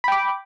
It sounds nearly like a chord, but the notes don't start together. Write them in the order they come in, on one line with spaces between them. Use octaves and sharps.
B5 G5 D6